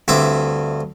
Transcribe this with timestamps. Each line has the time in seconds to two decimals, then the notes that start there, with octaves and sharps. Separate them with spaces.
0.08 D2 G2 C4 E5 D6